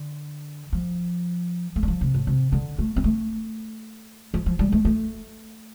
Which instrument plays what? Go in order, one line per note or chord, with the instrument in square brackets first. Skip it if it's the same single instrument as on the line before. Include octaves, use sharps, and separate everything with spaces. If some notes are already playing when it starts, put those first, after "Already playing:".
Already playing: [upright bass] D3
F3
A3
G3
F3
C3
A2
C3
D3
A3
C4
A3
F3
F3
G3
A3
A3